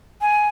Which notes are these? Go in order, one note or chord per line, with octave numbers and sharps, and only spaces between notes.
G#5